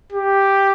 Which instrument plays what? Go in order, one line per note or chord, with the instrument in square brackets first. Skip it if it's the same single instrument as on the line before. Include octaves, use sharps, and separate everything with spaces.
[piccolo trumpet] G4